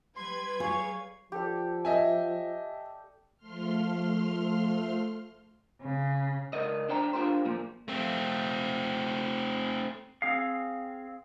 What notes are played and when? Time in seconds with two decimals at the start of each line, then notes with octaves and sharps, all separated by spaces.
0.17 G3 B4 C6 G#6
0.60 G#4 C#5 F5 C#6
1.32 F3 G4 A4 D5
1.85 D#5 E5 G#5
3.37 F3 A3 C6 F6
5.81 C#3
6.53 C#2 C#3 A#4 D5 D#5
6.89 D4 C5 D5 G5 A#5
7.13 D4 F4 G4 A#4 C5
7.45 A#2 F3 A#3
7.88 A3 C4
10.22 C4 G#4 F5